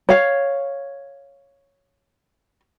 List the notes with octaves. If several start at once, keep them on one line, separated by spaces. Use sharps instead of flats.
C#5 F5